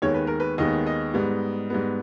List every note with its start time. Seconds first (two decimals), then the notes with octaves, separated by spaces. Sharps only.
0.02 D#2 D#3 G#3 B3 C#5
0.14 B4
0.27 A#4
0.40 B4
0.58 D#2 D#3 G#3 B3 D#5
0.87 D#5
1.14 G#2 G3 B3
1.70 G#2 G3 B3